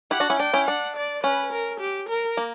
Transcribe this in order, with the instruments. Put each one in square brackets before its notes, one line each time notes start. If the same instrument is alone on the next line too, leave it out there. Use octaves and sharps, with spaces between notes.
[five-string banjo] E4 G4 [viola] F#5
[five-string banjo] D4 F#4
C#4 E4
[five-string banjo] D4 [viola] G5
[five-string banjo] C#4 E4
[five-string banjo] D4 [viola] F#5
[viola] D5
[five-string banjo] C#4 [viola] B4
[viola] A#4
G4
A#4
[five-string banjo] A#3